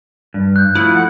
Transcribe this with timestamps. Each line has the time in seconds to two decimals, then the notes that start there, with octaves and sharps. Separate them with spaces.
0.34 G2
0.56 F#6 G6
0.75 F3 A3 E4
0.95 F#5